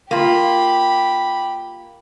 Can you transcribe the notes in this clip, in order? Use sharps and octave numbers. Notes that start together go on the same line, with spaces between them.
A#3 F4 G4 B5